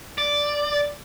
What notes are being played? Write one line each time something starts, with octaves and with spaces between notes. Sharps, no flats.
D5